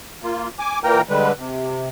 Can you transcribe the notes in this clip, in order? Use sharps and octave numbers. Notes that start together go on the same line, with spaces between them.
A#3 F4
G#5 D6
A#2 E3 A#3 A#4 G5 A#5
D3 G3 G#3 B4
C3